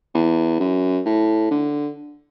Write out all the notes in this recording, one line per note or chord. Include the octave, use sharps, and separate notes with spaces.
E2
F#2
A2
D3